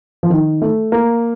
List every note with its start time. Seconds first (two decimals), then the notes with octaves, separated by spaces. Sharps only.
0.23 F3
0.30 D#3
0.62 A3
0.92 A#3